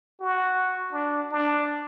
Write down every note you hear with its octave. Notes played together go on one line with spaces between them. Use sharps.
F#4
D4
D4